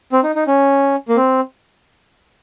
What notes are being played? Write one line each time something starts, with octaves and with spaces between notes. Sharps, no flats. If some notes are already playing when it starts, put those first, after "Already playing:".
C4
D#4
D#4
C#4
A#3
C4